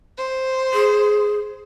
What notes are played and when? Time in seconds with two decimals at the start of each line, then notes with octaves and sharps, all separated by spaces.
0.18 C5
0.73 G#4